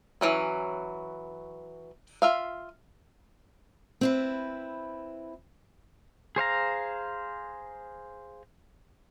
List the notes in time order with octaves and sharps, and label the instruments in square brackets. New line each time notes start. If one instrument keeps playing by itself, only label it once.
[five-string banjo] E3 F#3 C#4
F4 E5 F5
[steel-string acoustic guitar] C4 E4 B4
[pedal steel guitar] G#4 C5 F5 A#5